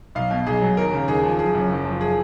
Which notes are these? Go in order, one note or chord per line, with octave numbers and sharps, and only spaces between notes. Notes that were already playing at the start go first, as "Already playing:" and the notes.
B1 F5
B2
B1 G#4
F#3
D#2 A#4
C#3
D#2 G#4
F3
F#1 G#4
F#2
F#1
F3
G#4